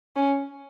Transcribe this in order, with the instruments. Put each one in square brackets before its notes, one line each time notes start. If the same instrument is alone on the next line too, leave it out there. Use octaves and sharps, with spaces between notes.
[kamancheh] C#4